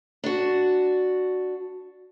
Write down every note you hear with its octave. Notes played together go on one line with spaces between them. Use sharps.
D4 F#4